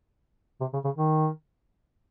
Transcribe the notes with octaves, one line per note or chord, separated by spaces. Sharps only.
C3
C#3
C#3
D#3